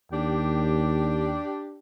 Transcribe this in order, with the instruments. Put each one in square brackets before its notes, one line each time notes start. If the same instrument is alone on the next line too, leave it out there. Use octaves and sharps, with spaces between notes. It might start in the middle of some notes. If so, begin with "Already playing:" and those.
[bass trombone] D#2 [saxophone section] D4 G4